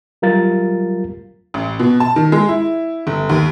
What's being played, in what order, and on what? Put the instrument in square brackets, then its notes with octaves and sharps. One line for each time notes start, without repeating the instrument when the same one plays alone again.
[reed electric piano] F#3 G3 F4 A#4 F5 A6
[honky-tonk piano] A1
B2
A5
D#3
G#3
E4
G1
D#2